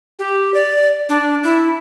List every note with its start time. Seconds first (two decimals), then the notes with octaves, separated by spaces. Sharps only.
0.19 G4
0.54 D5
1.09 D4
1.43 E4